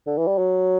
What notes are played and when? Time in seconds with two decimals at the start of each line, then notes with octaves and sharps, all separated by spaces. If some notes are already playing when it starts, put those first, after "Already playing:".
0.07 D3
0.18 E3
0.27 G3
0.38 F#3